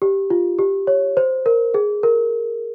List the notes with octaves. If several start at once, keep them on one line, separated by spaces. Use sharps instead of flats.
G4
F4
G4
C#5
C5
A#4
G#4
A#4